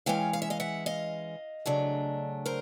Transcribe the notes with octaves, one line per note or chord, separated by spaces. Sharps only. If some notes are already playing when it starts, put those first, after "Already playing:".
E3 G#3 C#4 F5 G5
F5
E5
D#5 F5
E5 F#5
D#5 F5
C#3 F#3 A3 D4
A#4 C5